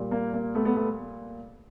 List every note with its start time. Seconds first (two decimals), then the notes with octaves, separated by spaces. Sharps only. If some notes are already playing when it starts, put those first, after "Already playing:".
Already playing: A#2 G3
0.11 A#3
0.33 A#3
0.55 A3 B3
0.65 A3 B3
0.76 A3 B3